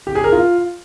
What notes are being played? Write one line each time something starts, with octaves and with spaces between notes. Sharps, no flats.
G4
G#4
A#4
F4